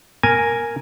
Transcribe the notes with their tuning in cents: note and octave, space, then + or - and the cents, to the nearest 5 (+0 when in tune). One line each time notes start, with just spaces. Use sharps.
A#4 +0 G#5 +0